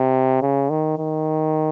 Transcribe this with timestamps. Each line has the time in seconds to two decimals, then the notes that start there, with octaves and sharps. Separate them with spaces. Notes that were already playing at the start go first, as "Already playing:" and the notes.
Already playing: C3
0.42 C#3
0.70 D#3
0.99 D#3